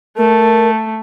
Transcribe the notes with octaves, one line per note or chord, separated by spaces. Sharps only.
A3 A#4